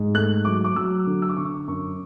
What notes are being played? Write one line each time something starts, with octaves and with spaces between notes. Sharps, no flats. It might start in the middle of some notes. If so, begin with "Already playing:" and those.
Already playing: G#2
A3 F#6
F#3 D6
D6
F#3 E6
D3
E6
D6
D3 C#6
D6
F#2 C#6